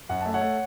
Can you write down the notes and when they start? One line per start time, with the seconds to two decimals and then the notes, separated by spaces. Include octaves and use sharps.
0.09 F#2 F#5
0.21 A3 A5
0.34 C#5 F#5
0.41 A3